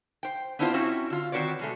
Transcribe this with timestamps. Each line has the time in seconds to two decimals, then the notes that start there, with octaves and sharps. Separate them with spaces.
0.23 C5 G5
0.59 B3 C4 D4 E4 F4 C5
0.74 C4 C#4 E4 F#4
1.10 D3 F4
1.32 D#3 C4 F#4 B4 C#5 D5
1.59 B2 G#3 A3